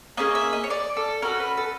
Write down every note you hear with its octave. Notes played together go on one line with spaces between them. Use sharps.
A#3 C#4 G#4 D#5
E5
D#5
C#5
D5
A4
C#4 F#4 A4 A#4
B4
A4